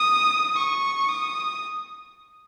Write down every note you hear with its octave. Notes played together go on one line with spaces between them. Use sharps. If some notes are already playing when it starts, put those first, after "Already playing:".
Already playing: D#6
C#6
D#6